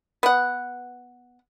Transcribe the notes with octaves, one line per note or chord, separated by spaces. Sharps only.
B3 F#5